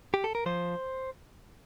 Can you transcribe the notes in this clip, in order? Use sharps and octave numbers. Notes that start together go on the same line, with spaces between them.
G4
A4
A#4
F3 C5